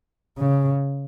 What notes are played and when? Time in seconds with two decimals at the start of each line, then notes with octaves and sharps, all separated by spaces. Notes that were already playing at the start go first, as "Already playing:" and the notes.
0.38 C#3